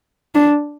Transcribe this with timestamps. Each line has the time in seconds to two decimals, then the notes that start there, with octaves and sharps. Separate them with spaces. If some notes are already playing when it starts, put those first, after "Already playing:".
0.35 D4